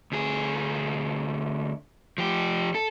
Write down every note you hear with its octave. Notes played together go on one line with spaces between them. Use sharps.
D2 G#4
F3 G4
A4